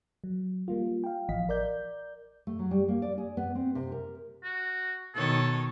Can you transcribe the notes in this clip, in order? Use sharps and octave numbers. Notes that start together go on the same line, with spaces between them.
F#3
G3 A#3 F4
F5 G5
A1 E3 F3 D#5 F5 B6
A#4 D5 G6
A3
F#3
G3
A#3
D5
G#4
B3
C4
C3
A#4
F#4
B2 D#3 A4 C#5